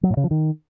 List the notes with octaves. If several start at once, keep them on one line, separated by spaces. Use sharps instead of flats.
F#3
A2
C#3
F3
D#3